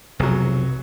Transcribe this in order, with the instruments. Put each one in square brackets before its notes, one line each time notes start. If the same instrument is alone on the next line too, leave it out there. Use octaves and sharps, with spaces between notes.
[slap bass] F1 B1 [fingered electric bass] C3 [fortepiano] F#3 G#4